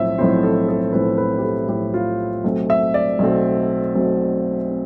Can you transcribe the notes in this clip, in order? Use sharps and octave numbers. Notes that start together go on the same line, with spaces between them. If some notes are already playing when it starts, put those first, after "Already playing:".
Already playing: B1 A2 F3 C4 E5
B1 A2 F3 C4 C5
A4
A4
B1 A2 F3 C4 B4
B4
G4
A4
B1 A2 F3 C4 G4
F4
B1 B2 A3 C4
E5
D5
B1 B2 A3 C4
B1 B2 A3 C4
C4